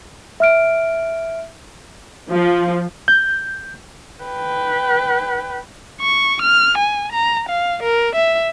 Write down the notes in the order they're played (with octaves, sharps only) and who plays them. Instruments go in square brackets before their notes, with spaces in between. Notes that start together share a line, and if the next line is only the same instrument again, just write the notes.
[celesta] E5 F6 D7
[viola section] F3
[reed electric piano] G6
[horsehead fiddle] B4 G5
[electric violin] C#6
F6
G#5
A#5
F5
A#4
E5